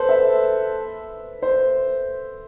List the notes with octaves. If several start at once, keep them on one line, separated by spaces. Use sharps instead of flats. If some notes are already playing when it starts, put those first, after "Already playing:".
Already playing: A4 B4 C5
E5
C5